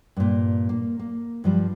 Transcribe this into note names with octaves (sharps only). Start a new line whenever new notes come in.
G2 A#2
A#3
A#3
G2 F3 G3